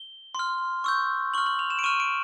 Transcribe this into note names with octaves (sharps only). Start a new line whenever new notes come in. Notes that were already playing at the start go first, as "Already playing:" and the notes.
Already playing: G7
C6 F6
C#6 E6 G6
C#6 F6 F#7
F#7
F7
E7
D7
C#6 F6 D#7
D7